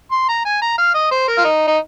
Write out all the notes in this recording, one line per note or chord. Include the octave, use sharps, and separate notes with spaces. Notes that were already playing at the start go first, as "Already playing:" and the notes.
C6
A#5
G#5
A#5
F5
D#5
C5
A#4
F4
D#4
D#4